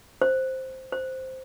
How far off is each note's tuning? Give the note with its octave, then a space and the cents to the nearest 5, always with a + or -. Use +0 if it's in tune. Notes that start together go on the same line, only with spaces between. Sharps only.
C5 +0
C5 -5